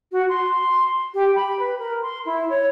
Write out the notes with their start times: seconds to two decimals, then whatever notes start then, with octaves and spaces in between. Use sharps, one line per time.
0.12 F#4
0.29 C6
1.14 G4
1.35 B5
1.59 B4
1.78 A#4
2.02 C6
2.25 E4
2.49 C#5